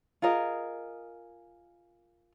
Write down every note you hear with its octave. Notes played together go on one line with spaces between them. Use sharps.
F4 G#4 A#4 D#5